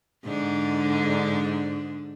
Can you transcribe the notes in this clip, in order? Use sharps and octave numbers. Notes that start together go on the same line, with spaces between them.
G#2 D3 D4